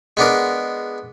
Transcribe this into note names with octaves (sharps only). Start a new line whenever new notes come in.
G#3 B3 D4 A#4